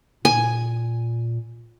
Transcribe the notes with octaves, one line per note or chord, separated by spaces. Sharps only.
A#2 G#5